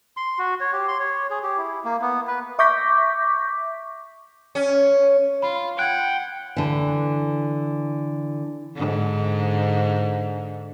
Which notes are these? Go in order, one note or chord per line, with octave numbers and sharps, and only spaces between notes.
C6
F#4
C#5
G4
C6
C#5
G#4
G4
E4
A#3
B3
B4
E5 C#6 D6 G6 A#6 B6
C#4
F4 B5
F#5 G5 F#6 G#6
D3 E3
G#2 D3